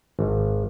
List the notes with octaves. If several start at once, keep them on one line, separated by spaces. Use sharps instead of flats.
G#1